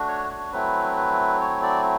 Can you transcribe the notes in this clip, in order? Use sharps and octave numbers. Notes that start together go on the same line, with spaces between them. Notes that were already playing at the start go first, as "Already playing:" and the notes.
Already playing: A3 D4 F#4
C#5
C#5
F#3 A3 C4 E4 B4
B4
C#5
D5